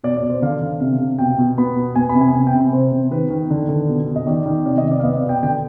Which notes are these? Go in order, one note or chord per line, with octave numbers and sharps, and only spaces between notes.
B2 D5
D5
B2
C5
D3 F5
D3
C3 F5
C3
B2 G5
B2
B3 B5
B2
B3 G#5
B5
C3
G#5
C3 G#5
G5
C3
B5
C3 C5
C3
D#3 B4
D#3
D3
D3
B2
B2
D#5
D#3 D5
D#3
C3 D5
D#5
C3
D5
F5
B3 D#5
D5
B2
G5
D3 G5